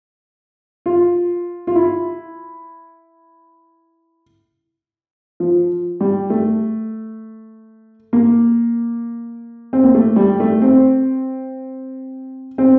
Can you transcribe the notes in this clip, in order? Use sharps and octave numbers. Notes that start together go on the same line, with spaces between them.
F4
F4
E4
F3
G3
A3
A#3
C4
A#3
A3
G3
A3
C4
C4